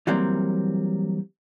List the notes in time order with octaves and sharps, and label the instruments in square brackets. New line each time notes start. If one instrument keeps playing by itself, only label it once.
[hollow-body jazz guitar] E3 F#3 G3 A#3 C4